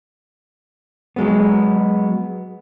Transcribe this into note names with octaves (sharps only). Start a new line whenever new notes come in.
F#3 G#3 B3